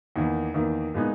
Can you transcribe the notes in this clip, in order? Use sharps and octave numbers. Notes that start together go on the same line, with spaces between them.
E2 D#3 A#3
E2 D#3 A#3
A#2 G#3 B3 D#4